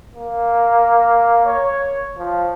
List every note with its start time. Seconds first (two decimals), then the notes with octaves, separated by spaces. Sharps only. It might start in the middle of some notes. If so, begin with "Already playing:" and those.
0.14 A#3
1.45 C#5
2.17 F3